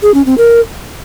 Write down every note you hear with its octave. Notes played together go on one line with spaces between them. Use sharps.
G#4
C#4
C4
A#4